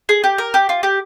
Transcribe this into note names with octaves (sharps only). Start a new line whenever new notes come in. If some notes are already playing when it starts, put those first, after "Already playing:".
G#4
G4
A#4
G4
F4
G4